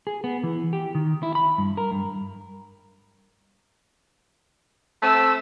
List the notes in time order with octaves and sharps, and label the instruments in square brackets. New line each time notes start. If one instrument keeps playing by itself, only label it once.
[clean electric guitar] G#4
B3
E3
G4
D#3
E4
B5
G2
A#4
G2
[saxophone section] A3 C4 [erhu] E6